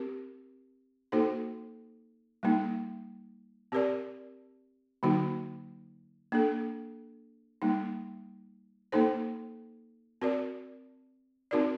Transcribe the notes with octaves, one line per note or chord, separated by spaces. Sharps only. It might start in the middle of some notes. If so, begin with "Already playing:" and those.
Already playing: C4 G4 A#4
A#3 D#4 F#4 A4 C5
G3 A#3 D#4
C4 G4 A#4 D5
D3 F#3 A#3 D#4 F#4
A#3 D4 A4
G3 A#3 D#4
A#3 D#4 A4 C5
C4 F#4 A#4 D5
C4 D#4 F#4 A#4 D5